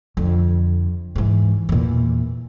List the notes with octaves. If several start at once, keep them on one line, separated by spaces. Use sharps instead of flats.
F2 D3
G#2 E3
E2 A#2